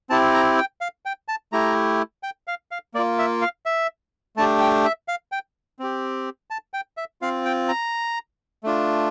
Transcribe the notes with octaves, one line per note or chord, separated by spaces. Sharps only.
C4 E4 G4 A5
A#5
G5
F5
G5
A5
A3 E4 G4 A#5
G5
F5
F5
A#3 F4 D5
E5
F5
E5
A3 D4 G4 A5
G5
E5
F5
G5
C4 G4
A5
G5
E5
C4 F4 F5
G5
A#5
A3 D4 F4